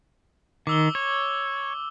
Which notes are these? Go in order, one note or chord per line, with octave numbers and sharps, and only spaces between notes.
D#3 D6 E6 G7
C#5